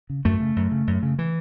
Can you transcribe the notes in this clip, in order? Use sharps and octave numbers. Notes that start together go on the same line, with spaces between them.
C#3
F#2 A3
C#3
F#2
C#3
F#2
C#3
E3